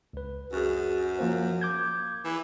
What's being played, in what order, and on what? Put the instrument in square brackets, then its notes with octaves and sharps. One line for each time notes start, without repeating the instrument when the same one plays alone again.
[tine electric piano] C#2 B4
[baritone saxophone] F#2 [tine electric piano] F#4 G#4
[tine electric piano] F3 A#3 C5
D6 G6 G#6
[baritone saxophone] E3